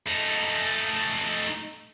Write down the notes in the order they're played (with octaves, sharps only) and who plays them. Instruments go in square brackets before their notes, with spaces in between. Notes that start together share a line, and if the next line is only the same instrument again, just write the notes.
[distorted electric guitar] A3 D#4